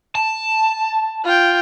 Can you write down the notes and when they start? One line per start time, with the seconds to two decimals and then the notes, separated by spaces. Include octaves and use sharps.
0.15 A5
1.24 F4 G5